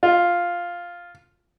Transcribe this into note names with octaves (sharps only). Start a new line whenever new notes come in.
F4